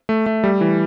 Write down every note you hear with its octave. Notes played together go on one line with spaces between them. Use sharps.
A3
A3
G3
E3